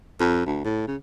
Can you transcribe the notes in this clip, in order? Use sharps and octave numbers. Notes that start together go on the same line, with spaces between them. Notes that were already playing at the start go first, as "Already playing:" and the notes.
F2
D2
A2
C#3